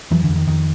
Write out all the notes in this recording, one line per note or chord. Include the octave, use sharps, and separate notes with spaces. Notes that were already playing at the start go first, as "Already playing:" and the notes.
F2 E3 F#3
D3 E3
F2
D#3
F2 D#3